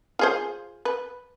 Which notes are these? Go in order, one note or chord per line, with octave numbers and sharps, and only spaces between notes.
F4 G#4 C5
B4